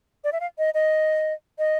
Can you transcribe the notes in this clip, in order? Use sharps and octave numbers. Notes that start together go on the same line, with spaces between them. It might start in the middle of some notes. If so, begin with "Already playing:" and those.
D5
E5
F5
D#5
D#5
D#5